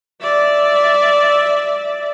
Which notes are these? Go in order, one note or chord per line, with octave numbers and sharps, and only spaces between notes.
D5 E5